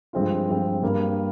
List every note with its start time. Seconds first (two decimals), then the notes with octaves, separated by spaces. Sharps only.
0.13 G2 F3 G#3 C4 F4
0.49 G2 F3 G#3 C4 F4
0.82 G2 G3 A#3